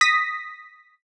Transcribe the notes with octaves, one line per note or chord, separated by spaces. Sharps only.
D#6 A#6 B6